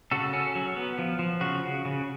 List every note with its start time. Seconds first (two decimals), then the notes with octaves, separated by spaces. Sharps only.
0.11 C#3 F#4 A4
0.33 C#4
0.55 F#3
0.77 B3
0.98 F3
1.19 F3
1.41 C#3 F#4
1.63 C#3
1.85 C#3